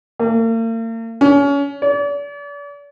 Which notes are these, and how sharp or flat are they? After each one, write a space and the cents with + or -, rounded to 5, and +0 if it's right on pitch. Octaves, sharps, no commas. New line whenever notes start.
A#3 -45
C#4 +30
D5 -40